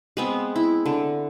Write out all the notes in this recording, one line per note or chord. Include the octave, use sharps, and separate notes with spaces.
G#3 B3 C4
E4
D3